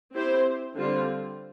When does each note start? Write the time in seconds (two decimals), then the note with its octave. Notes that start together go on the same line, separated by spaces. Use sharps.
0.14 C4 E4 G4 C5
0.76 D3 G3 C4 F4